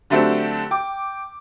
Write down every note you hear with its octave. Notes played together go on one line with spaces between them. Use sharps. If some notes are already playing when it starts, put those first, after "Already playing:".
D3 F#3 A3 C4 D4 G4
G5 D6